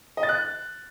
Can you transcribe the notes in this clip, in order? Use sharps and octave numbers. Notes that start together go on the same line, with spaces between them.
D#5
A6
F#6